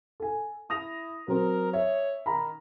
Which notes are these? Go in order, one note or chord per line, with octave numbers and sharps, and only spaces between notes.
A4 G#5
E4 D#6 A#6 F7
F#3 C4 A#4
C#5 E5
D#3 A#5 B5